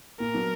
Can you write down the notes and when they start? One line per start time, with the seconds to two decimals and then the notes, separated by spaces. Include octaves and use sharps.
0.20 A#2 A#4
0.34 F#3 B3 D4